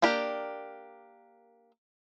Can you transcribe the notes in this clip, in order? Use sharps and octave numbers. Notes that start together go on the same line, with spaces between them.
A#3 D4 G4 A#4